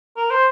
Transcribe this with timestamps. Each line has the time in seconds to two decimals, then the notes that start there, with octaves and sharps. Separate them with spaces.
0.17 A#4
0.30 C5